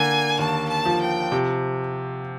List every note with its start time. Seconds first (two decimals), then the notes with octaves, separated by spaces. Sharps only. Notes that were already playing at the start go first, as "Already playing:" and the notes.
Already playing: D3 A#3 G#5
0.39 D#2 A5
0.69 A5
0.85 F3
1.00 G5
1.32 C3